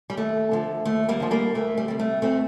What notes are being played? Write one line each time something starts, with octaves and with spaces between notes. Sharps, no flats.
G3
D#2 A3
D3 F3
D#2 A3
G3 A#3
D3 F3
G3 A#3
D2 A3
G3
C3 G3
A3
D2 A3 C4